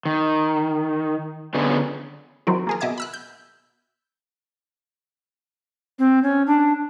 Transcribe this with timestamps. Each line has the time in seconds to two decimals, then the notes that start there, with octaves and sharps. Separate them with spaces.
0.05 D#3
1.54 D3 B3 C#4 F4 G#4
2.47 D#3 F#3 C4 E4
2.67 A#3 G#4 A#4
2.81 B2 D#5 E5 D6 G#6
2.98 B5 E6 F#6
3.14 G6
5.99 C4
6.23 C#4
6.47 D4